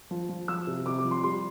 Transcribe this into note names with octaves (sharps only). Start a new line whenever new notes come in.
F3
F3
F3 E6
C3
C3 D6
D6
F3
C6
G3 C6